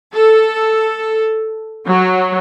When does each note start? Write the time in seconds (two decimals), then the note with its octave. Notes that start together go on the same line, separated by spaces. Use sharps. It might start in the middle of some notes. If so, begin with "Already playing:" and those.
0.13 A4
1.86 F#3